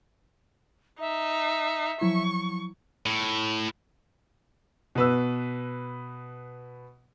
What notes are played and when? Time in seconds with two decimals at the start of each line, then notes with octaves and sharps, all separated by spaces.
1.00 D#4 E5
2.01 F3 F#3 E4 C#6
3.06 A2
4.95 B2 B4 E6